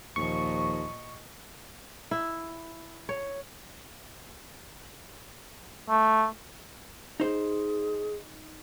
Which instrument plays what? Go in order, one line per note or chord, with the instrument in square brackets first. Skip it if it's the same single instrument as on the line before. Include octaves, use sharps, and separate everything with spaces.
[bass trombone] D#2 [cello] A#2 D#5 [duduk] F3 [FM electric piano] C#6
[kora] E4
C#5
[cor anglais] A3
[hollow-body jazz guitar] D#4 C5 [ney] G#4